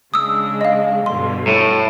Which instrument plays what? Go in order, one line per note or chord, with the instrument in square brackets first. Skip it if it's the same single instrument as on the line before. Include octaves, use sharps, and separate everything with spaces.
[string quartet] C#3 G#3 D4 [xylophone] D#6 E6
[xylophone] D#5 F5
[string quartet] G2 B2 D3 [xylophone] C6
[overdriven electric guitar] A2